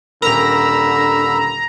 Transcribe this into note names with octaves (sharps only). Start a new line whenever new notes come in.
D#1 D3 A#4 A#5 B5 E6